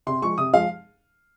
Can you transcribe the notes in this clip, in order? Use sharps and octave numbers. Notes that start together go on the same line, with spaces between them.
C3 C6
F3 G#3 C#6
C3 D#6
F3 G#3 F5